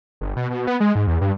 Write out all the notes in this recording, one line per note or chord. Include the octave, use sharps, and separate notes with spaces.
G1
B2
B2
B3
G#3
G#2
E2
G2